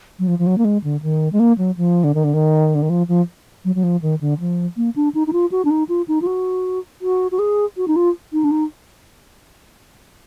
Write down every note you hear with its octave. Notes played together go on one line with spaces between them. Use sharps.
F#3
F3
F3
F#3
A#3
G#3
D3
D#3
G#3
A#3
F#3
F3
D3
D#3
D3
D#3
D3
D#3
F3
F3
F#3
F#3
F3
D#3
D3
F3
A#3
D4
D#4
D#4
F4
F#4
D4
D#4
F4
D#4
F4
F#4
F#4
F#4
G#4
F#4
D#4
F4
D#4
D4
D#4